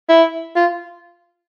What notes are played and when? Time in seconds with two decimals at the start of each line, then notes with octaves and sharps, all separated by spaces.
0.09 E4
0.56 F4